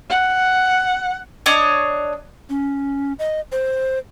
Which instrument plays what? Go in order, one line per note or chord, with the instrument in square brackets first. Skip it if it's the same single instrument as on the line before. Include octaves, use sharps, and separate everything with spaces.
[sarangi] F#5
[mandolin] D4 C#5 D#5
[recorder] C#4
D#5
C5